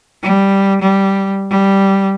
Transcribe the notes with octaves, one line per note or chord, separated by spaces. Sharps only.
G3
G3
G3